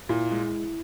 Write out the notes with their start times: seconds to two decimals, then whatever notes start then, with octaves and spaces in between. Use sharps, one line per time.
0.09 A#2 E4
0.31 G#3